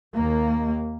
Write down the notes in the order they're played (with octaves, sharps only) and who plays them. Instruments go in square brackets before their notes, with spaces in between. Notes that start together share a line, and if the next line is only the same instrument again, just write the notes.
[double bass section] D#2 A#3